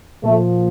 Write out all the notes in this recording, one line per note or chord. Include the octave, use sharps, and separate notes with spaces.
A#2 F3 A3